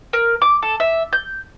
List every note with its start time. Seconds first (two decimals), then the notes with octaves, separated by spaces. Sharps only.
0.13 A#4
0.42 D6
0.62 A4
0.80 E5
1.13 G6